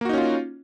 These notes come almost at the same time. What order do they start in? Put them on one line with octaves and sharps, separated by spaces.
A#3 F#4 D#4 C#4 F4